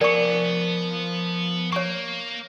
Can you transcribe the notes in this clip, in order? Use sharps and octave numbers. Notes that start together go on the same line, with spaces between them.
F3 B3 A#4 D5 G#5 C#6 C#7
A#3 C#5 C#6